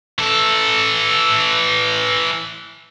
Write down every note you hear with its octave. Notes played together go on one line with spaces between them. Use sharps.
E3 A4